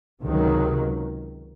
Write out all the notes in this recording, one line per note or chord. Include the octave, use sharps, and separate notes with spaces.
C#2 C3 D#3 F#3